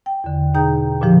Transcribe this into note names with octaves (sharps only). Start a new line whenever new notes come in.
G5
E2 D3
B2 D#4 G#4 G5 A#5 G6
A#2 D3 F3 G4